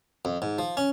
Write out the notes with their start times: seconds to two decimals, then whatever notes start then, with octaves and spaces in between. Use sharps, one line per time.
0.25 F2
0.42 G#2
0.59 F3
0.77 C#4